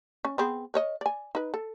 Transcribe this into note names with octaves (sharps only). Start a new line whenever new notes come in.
C#4
B3 C4 G#4
A#4 C#5 D#5
D5 G#5
D#4 B4
A4